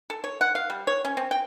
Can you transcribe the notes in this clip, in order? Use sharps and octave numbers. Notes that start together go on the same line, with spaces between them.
A4
C#5
F#5
F5
G3
C#5
C#4
C4
G5